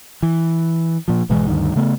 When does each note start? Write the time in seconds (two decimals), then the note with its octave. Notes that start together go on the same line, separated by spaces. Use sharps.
0.23 E3
1.08 A#2 F3
1.29 G#1 B2 E3 G#3
1.47 D2 G2 D#3
1.76 C#3 A3 B3